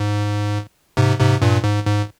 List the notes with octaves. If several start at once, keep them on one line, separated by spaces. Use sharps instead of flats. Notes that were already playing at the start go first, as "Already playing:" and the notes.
Already playing: G#2
G#2 C3
G#2 C3
G2 A#2
G#2
G#2